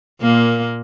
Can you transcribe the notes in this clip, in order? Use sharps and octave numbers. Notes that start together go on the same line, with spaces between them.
A#2 A#3